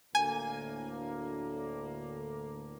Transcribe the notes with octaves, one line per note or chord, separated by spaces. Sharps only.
D2 A2 A#3 G#5